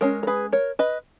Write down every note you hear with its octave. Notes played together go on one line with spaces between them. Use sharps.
G#3 C#4 A#4 C#5
A#4
G#4 B4
A#4 C#5
B4 D#5